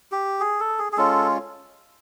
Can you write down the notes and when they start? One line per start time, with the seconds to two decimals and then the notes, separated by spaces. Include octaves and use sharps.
0.12 G4
0.40 G#4
0.60 A4
0.79 G#4
0.93 G#4
0.97 G#3 C#4 F4 A4